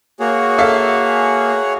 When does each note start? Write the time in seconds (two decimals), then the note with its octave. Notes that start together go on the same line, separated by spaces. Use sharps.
0.20 A#3 F#4 G#4 C#5
0.58 A4 E5 F5